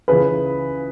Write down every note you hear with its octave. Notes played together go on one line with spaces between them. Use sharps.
C#2 C#3 E3 G#4 B4